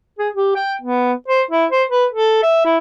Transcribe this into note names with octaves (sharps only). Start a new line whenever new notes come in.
G#4
G4
G5
B3
C5
E4
C5
B4
A4
E5
E4